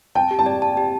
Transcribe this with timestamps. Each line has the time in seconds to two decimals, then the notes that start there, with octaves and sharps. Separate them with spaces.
0.15 G5 A5
0.31 G4
0.39 A5
0.46 D5
0.62 A5
0.77 G4